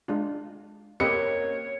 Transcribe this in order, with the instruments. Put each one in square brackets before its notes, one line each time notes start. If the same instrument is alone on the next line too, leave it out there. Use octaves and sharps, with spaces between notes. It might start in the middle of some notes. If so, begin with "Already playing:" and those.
[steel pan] G#3 D4 F4
[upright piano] A#3 C#7 [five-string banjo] C4 C#4 D#5 [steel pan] G4 B4 [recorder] C#5